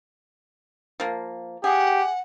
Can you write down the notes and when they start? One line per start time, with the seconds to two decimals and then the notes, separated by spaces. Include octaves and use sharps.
1.00 F3 A#3
1.64 G4 G#4 F#5